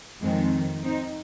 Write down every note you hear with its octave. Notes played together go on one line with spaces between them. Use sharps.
F2 D#3 G#3 C4
C4 D#4